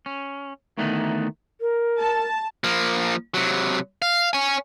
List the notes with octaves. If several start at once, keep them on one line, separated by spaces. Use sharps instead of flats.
C#4
D2 D#3 E3 A3 B3 D#4
A#4
A5
F3 A#3
C3 F#3
F5
C#5 G#5